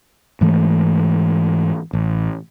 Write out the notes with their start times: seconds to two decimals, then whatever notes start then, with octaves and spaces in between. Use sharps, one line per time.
0.41 G#2 E3 A3
1.93 A1